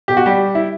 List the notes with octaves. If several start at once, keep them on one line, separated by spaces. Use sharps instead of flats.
B2 G4
F#4
G3 G4
E4